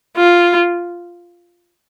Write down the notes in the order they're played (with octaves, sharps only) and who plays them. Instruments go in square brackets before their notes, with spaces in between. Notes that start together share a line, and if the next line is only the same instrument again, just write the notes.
[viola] F4